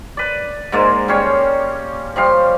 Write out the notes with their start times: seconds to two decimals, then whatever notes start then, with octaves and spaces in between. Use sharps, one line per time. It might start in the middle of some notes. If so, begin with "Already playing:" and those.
0.17 B4 D5
0.72 G#2 G#3 A#3 D5
1.08 G3 C#4 C#5 C6
2.16 F3 G3 F5